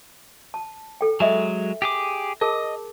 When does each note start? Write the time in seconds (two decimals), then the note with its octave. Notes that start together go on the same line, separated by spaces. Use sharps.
0.54 A5
1.01 A4 G5
1.20 F#3 G#3 D#5 E5 G#5
1.82 G4 G#4 D6
2.41 G#4 A#4 D#5 A5